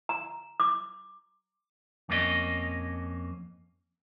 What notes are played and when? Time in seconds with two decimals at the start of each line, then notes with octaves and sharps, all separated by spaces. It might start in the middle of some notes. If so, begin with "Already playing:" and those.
0.09 A#5
0.60 D6
2.09 F2 A#3 C#4 E4 D#5